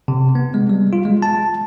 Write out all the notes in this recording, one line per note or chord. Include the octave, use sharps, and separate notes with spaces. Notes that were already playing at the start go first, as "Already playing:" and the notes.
C3
B3
G#3
G3
F4
G#3
A5